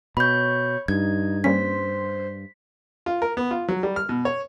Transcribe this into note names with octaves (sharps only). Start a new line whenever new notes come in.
B2 C#5 B5 G6
G2 D#4 G#6
G3 A#3 C#4 C5 B6
F4
A#4
B3
F4
F#3
G3
F6
B2
C#5